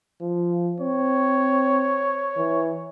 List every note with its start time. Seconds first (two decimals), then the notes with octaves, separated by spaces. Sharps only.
0.21 F3
0.81 C4 C#5
2.37 E3